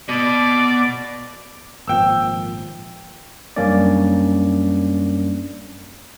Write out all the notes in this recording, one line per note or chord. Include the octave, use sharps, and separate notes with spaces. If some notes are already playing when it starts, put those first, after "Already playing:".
B2 D5
G#1 A#2 F3 G5 E6
F#2 G3 A#3 C#4 D4 D5